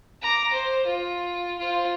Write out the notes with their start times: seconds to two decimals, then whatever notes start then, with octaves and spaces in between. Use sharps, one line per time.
0.22 A#5 D6
0.53 C5
0.86 F4
1.59 F4 C5